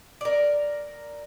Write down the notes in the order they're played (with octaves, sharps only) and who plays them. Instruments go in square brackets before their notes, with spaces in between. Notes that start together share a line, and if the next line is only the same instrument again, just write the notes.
[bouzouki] A#4 D5